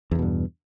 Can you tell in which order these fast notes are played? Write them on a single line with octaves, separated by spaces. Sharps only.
E2 D3 B2 G2